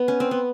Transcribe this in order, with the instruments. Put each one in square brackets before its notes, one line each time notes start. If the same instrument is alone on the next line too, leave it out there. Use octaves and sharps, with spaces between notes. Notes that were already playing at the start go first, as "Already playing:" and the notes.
Already playing: [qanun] B3
C#4
C4
B3